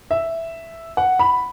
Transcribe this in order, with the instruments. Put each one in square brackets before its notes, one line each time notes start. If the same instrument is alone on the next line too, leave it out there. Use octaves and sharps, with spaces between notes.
[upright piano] E5
F#5
B5